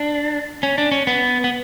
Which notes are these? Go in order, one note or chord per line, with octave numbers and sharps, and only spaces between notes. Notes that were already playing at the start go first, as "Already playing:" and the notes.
Already playing: D4
C#4
D4
C#4
B3
B3